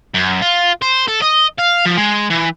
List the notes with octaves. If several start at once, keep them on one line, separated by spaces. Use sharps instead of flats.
F#2
F4
C5
A4
D#5
F5
F3
G#3
E3